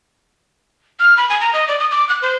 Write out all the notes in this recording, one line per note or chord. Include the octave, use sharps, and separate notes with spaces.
F6
B5
G#5
A#5
D#5
D5
D#6
D6
F#6
C5